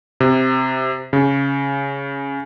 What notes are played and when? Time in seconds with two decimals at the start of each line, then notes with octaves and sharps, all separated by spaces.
0.20 C3
1.13 C#3